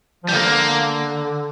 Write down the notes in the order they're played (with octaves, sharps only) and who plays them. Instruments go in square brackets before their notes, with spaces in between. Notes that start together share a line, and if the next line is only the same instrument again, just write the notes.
[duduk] F3
[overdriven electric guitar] G3
[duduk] D3 [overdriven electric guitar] A#3